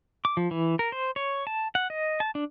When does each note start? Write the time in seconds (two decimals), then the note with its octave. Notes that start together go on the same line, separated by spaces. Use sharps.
0.25 D6
0.37 F3
0.51 E3
0.79 A#4
0.92 C5
1.16 C#5
1.47 A5
1.75 F#5
1.90 D#5
2.20 A5
2.35 D4